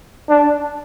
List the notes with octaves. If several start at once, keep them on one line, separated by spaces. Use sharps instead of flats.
D4